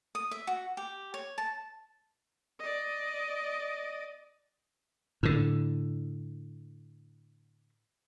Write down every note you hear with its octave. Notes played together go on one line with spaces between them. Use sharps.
D#6
E5
F#4
G4
C#5
A5
D5 D#5
A2 D3